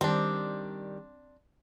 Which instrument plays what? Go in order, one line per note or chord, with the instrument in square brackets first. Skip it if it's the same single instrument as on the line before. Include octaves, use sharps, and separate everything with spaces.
[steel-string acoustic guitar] D#3 G3 [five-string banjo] C4 D4